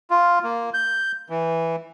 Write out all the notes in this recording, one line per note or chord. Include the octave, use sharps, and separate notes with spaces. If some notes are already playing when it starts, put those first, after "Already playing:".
F4
A#3
G6
E3